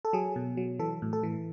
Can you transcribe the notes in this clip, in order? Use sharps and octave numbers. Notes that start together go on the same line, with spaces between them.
A4
F#3 G#4
B2
F#3
E3 A4
A2
A4
E3